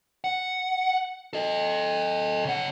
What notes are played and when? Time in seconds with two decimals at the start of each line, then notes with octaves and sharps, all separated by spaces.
0.24 F#5
1.33 A4 D#5
2.45 C#3 F#5